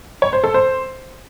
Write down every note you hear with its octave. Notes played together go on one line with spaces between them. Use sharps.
C#5
C5
A4
C5